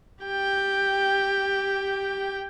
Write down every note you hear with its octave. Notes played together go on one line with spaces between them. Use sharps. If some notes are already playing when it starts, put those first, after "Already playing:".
G4 G5